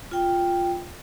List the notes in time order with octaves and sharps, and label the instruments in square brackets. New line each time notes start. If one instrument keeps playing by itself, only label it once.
[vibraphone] F4 G5